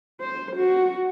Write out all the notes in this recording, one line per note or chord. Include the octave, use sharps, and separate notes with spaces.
C5
F#4